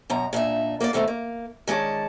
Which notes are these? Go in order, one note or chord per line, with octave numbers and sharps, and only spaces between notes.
F#2 B2 A#5
A#2 D4 D#4 E5
A#3 B3 A#4 D5
B2 D#3 A3 C4 D#4
A#3
D#3 G#3 C#4 D5 A5